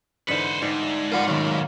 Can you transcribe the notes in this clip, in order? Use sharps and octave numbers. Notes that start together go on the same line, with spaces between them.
G#2 D3 E3 B4 C5 C#7
G#2 G3 D#4
E5
G3 F4 A#4 F#5
D#3 F#3 C#4 F#4 C#5
A#3